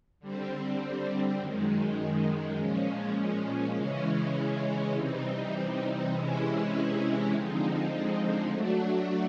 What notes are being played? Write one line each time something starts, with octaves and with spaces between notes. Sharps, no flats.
D3 G3 C4
F#2 D#3 G#3
A#2 F3 G#3 C#4
C#3 E3 G#3 C#4
C3 E3 G3 C4 D#4
C3 E3 G#3 C#4 E4
D3 F3 G#3 C4 D#4
F#3 A3 D4 F#4